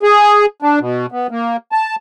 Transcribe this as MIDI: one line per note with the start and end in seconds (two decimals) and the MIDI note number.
0.03 0.46 68
0.62 0.79 62
0.80 1.06 47
1.12 1.27 59
1.31 1.57 58
1.72 1.96 81